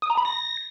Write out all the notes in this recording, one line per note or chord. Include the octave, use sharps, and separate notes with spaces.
D#6
A#5
B5
A#6